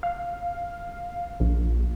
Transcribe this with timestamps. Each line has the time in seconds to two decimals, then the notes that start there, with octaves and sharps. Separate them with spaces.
0.03 F5
1.40 A#1